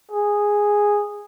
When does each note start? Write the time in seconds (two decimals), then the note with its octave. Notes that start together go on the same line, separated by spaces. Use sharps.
0.11 G#4